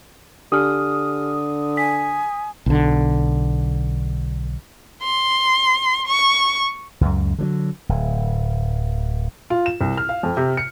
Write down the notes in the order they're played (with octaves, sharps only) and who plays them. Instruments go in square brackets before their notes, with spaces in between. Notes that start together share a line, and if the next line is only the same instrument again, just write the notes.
[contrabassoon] D3 [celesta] G4 G#5 F6 [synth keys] D#6
[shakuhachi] G#5 [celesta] B6
[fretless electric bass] B1 D3
[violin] C6
C#6
[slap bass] C#2 F#2
D3 F3 F#3
D1
[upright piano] F4
E7
C2
F6
F5
F2
C3
C#7